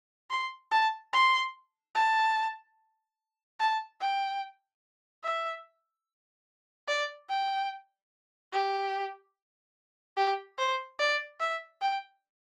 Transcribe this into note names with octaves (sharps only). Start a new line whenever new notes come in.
C6
A5
C6
A5
A5
G5
E5
D5
G5
G4
G4
C5
D5
E5
G5